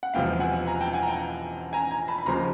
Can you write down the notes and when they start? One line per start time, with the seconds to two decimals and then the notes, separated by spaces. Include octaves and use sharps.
0.03 F#5
0.14 E1 E2 C3 F3 F5 G5
0.40 F#5 G#5
0.67 G#5 A#5
0.81 G5 A5
0.93 F#5 G#5
1.03 A#5
1.07 G5 A5
1.73 G#5 A#5
1.91 G#5 A#5
2.08 A5 B5
2.18 B5
2.26 F1 D#2 C#3 F3 A#5 C6